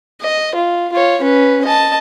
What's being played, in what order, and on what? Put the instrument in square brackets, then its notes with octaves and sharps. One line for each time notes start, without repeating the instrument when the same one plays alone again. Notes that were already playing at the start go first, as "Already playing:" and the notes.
[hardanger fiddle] D#5
F4
F4 C#5
C#4 B4
D#5 A5